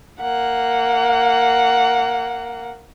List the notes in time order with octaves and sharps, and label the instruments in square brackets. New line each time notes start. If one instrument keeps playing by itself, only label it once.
[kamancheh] A#3 F#5